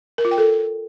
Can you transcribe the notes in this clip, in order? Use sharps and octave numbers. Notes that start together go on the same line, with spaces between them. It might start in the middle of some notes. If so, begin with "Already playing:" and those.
A#4
F4
G5
A4